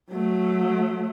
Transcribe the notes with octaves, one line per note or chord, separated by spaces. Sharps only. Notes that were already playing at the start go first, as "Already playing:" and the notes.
F#3 A3